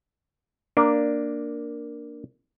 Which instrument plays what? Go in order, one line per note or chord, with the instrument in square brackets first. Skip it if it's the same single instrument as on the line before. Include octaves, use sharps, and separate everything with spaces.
[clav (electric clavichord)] A#3 D4